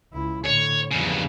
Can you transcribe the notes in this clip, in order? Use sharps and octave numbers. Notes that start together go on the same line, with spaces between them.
C#2 E4
A2 D3 C#5
E2 G2 C#3 F3